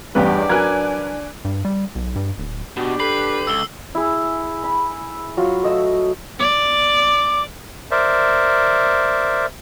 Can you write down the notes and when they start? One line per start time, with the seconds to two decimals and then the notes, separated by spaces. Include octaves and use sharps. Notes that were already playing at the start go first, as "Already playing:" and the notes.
0.15 A1 E2 G2 D4 G4 B4 D5
0.49 F#3 A#4 B4 G#5 F#6 G#6
1.45 G2
1.65 G3
1.95 B1
2.16 G2
2.38 D1
2.77 B2 D4 F#4 G4
3.00 A4 B4 C7 F#7
3.47 C#2 E6 G7
3.95 E4 G#4
4.63 B5
5.37 F#3 F4
5.63 A3 D#5 E6
6.40 D5 D6
7.91 A#4 C5 D5 E5